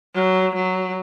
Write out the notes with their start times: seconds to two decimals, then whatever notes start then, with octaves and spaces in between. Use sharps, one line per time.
0.15 F#3
0.55 F#3